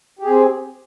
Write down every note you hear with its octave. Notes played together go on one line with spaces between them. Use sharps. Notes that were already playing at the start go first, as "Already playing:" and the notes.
C4 G4 G#4